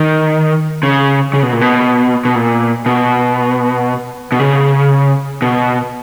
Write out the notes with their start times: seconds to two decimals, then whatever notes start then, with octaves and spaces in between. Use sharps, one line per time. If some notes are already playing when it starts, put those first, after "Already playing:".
Already playing: D#3
0.83 C#3
1.33 C#3
1.43 B2
1.52 A#2
1.61 B2
2.25 B2
2.35 A#2
2.86 B2
4.32 B2
4.39 C#3
5.42 B2